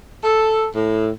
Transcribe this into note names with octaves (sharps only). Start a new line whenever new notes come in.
A4
A2